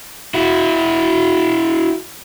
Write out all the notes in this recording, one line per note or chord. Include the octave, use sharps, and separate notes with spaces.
E4 F#4